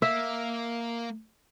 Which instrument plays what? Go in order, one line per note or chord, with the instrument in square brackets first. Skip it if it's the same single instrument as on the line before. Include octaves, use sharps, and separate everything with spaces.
[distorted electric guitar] A#3 [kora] E5